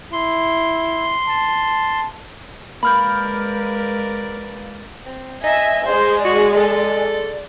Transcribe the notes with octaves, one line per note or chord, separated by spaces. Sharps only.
E4 C6
A5
G#3 A#3 A#4 B4 D5 B5 F6 G6
C4
D#5 E5 G#5
G#3 G#4 C5
F#4 D5
A4